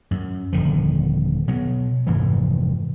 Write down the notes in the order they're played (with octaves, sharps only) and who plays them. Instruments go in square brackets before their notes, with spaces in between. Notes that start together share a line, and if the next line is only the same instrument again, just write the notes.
[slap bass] F#2
D#1 D3 D#3 F3
B2 F#3 B3
F1 G#2 E3 F3